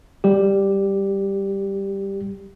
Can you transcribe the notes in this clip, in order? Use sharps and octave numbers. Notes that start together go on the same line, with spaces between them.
G3 G4